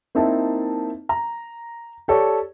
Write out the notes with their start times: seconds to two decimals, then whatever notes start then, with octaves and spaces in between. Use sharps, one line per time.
0.15 A#3 C4 D#4 E4 A5
1.09 A#5
2.08 G4 A4 C#5 D5